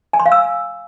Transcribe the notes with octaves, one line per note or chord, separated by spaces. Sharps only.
G#5
C6
F5
E6